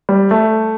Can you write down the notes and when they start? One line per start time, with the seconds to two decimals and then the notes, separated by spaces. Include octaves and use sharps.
0.09 G3
0.31 A3